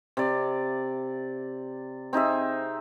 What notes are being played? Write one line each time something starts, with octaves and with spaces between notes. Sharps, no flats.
C3 D5
C4 D#4 G#4 E5